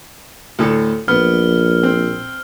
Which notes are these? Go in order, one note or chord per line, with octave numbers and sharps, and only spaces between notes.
D2 A2 A4
A#1 B3 F6
C4